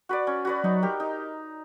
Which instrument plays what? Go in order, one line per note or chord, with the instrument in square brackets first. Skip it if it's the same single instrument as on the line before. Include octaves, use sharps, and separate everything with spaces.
[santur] F#4 B4 D5
C#4
F#4 B4 D5
[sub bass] F#3 [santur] D#4
[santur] G4 A#4
D#4